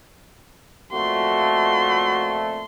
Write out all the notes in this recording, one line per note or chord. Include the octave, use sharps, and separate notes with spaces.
F2 A#2 A3 F#4 C6